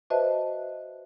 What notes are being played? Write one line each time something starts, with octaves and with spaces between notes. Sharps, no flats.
F#4 B4 C5 D#5 E5 A5